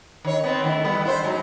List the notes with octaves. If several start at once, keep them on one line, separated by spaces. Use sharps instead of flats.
D#3 C#5
B3 C4
D#3 A3 E4
E3 G3 B3
E4 C5
G#2 F#3 D#4